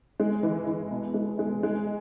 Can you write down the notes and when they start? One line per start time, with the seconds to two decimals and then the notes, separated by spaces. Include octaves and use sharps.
0.20 G#3
0.43 E3
0.67 E3
0.91 B2
1.14 G#3
1.39 G#3
1.63 G#3